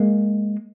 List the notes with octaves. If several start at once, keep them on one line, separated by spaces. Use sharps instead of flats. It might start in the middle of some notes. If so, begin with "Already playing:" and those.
Already playing: G#3 A#3